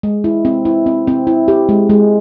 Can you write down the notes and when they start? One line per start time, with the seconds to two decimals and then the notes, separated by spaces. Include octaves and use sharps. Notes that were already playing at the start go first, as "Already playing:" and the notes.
0.03 G#3
0.24 E4
0.45 C4
0.65 E4
0.86 C4
1.07 C4
1.27 E4
1.48 G4
1.69 G#3
1.89 G#3